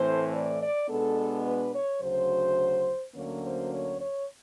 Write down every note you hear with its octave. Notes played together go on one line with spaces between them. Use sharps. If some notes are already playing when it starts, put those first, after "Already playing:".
Already playing: A2 E3 A3 C4 C5
D5
D5
B2 G#3 B3 D4 A4
B4
C#5
D2 C#3 F#3 C5
D2 D3 F#3 A#3 C#4 C#5
C5
C#5
C#5